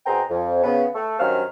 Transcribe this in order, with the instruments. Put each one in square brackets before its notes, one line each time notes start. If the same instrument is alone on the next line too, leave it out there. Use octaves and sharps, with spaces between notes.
[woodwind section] B2 C4 G#4 F#5 G5 A#5
F2
C#3 B3
A3
G2 D#3 F#3 C#4 C5 F6